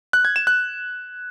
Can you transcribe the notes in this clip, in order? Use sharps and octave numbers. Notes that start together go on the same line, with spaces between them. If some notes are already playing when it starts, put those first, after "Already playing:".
F#6
G#6
E7
F#6